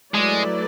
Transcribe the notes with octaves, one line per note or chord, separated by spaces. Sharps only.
F#3 G#3 A3 E4 B4 D5